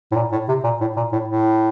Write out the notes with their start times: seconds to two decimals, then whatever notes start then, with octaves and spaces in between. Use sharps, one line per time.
0.12 A2
0.16 A#2
0.32 A2
0.48 C3
0.63 A#2
0.81 A2
0.96 A#2
1.12 A2
1.28 A2